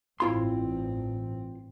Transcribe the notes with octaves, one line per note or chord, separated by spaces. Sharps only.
A1 G2 C4 E4 F4 C6